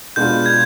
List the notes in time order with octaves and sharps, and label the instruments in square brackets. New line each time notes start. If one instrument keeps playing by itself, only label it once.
[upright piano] B2 G#3 B3 D4 F4 [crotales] G6
[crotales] G#6